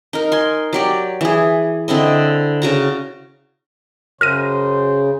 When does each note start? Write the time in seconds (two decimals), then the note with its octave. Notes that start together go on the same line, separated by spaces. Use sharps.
0.13 D#4 A#4
0.32 G#5 C6
0.73 F#3 G4 D5
1.21 E3 G#4
1.88 D3 C4 E4 D#5
2.62 C#3 F#4 A#5
4.21 F#2 C#3 C5 F6 A#6 D#7